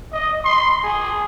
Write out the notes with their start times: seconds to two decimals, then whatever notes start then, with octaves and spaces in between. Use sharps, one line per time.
0.12 D#5
0.44 C6
0.83 G#4